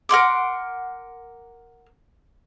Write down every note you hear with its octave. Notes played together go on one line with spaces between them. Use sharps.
A#4 F#5 C6 D6